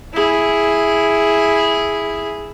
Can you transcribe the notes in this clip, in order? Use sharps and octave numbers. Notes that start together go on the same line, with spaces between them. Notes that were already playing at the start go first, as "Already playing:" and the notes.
E4 G#4